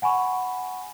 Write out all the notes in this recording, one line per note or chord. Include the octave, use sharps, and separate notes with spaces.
F#5 G#5 B5 C#6